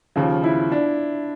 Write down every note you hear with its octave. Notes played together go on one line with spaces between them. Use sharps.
D#2 C#3 F3 F4
E4
D4